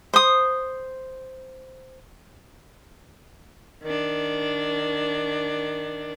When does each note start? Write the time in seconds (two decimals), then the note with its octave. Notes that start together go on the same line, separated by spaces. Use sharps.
0.14 C5 D#6
3.83 D#3 D4